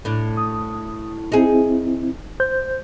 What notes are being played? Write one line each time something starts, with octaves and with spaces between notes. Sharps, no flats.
A2 D4
D#6
C4 D#4 E4 G#4
C5 G6